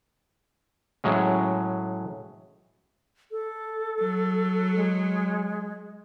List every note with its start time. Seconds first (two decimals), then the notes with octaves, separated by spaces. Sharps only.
1.04 A2 F#3 G#3 C#4
3.31 A4
4.01 F#3
4.76 G#3